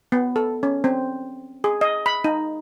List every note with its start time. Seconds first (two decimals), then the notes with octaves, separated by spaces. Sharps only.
0.12 B3
0.36 A4
0.63 C#4
0.84 C4
1.64 G#4
1.81 D#5
2.06 B5
2.24 D#4